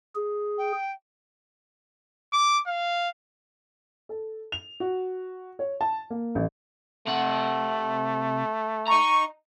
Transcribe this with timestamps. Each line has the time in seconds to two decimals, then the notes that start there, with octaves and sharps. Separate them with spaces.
0.15 G#4
0.57 G5
2.33 D6
2.67 F5
4.09 A4
4.52 F7
4.80 F#4
5.59 C#5
5.81 A5
6.10 A#3
6.35 A1
7.07 C3 A3 F#5
8.88 D#5 A#5 C#6